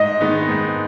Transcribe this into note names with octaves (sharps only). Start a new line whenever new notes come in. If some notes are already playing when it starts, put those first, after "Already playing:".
Already playing: G#2 D#5
D#3 G#3 B3 D#4
G#2